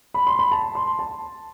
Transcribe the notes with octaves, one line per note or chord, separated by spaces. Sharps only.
B5
C6
B5
A5
C6
A5